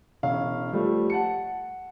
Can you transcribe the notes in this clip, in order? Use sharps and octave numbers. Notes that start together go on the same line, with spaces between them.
E1 C#4 F5
F3 G3 A3
F#5 A5 C#7